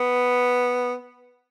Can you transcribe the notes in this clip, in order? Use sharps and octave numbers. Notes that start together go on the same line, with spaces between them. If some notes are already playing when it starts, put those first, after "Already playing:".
Already playing: B3